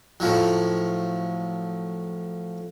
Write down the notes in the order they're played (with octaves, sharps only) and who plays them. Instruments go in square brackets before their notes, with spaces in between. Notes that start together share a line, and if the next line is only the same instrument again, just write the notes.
[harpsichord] A2 F3 F#3